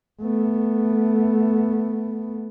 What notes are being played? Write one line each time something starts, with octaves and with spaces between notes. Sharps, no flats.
A3 B3